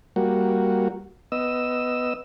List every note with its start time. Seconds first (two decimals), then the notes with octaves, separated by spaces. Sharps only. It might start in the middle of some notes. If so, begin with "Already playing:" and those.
0.16 G3 A#3 F#4
1.32 B3 D#5 E6